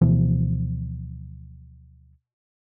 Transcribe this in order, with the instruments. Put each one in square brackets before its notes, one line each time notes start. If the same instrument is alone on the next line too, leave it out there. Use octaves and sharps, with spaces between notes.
[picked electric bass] D2 B2 E3 F3